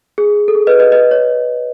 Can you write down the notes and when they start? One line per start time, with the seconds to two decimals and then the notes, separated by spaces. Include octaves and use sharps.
0.18 G#4
0.48 A4
0.55 G#4
0.67 B4 D#5
0.79 B4 D#5
0.92 B4 D#5
1.11 C#5